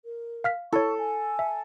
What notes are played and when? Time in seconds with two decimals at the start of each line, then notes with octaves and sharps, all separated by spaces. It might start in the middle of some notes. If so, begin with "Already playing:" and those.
0.05 A#4
0.44 F5 F6 B6
0.73 E4 A4 C#5 C#6
0.98 G#5
1.39 E5